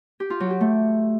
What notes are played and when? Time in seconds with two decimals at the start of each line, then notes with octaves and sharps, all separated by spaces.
0.20 G4
0.30 F4
0.40 F#3
0.50 G4
0.61 A3